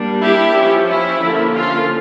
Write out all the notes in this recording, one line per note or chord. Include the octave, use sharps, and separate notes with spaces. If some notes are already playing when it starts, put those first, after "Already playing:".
Already playing: G3 A#3 D4
E4 G4
F3 C#4
E4
D3 F3 A#3 C#4
F4